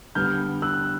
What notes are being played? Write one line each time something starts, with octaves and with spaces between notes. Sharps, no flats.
D3 G3 B3 F6 G6
E6 F#6